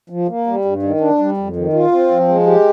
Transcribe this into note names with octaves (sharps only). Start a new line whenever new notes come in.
F3
A#3
G3
G2
D#3
D4
G3
F2
D#3
F4
C4
F3
G#3
G4